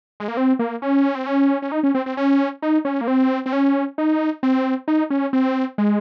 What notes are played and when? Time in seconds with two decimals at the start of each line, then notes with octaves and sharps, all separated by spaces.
0.20 G#3
0.28 A#3
0.37 C4
0.59 A#3
0.82 C#4
1.15 C4
1.26 C#4
1.62 C#4
1.72 D#4
1.83 C#4
1.95 C4
2.06 C4
2.17 C#4
2.62 D#4
2.85 C#4
3.01 A#3
3.08 C4
3.46 C4
3.53 C#4
3.98 D#4
4.43 C4
4.88 D#4
5.10 C#4
5.33 C4
5.78 G#3